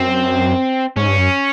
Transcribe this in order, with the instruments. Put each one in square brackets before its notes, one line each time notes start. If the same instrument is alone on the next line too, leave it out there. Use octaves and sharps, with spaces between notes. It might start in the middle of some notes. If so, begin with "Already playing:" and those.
Already playing: [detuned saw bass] F#2 [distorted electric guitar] C4
[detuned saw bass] G#2 [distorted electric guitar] C#4
[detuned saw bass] G2
F#2